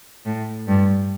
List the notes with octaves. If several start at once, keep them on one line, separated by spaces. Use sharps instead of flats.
A2
G2